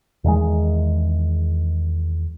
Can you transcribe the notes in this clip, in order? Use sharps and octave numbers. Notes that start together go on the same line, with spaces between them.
E2 D#3 G#3